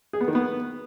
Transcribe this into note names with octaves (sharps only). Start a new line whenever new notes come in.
G#4
B3
D#3
B3